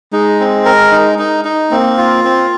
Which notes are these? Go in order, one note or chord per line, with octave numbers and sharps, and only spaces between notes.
G#3 D#4
C4
A#4
D#4
D#4
D#4
A#3 C4
F4
C4